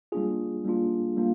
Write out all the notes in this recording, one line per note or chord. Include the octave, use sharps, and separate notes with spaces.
G3 A#3 D4 F4 G#4
G3 A#3 D4 F4
G3 A#3 D4 F4